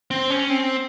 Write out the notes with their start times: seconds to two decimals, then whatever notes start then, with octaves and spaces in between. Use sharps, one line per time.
0.11 C4
0.30 C#4
0.50 C4